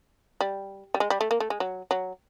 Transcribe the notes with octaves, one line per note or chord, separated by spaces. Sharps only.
G3
G3
G#3
G3
A3
A#3
A3
G#3
F#3
F#3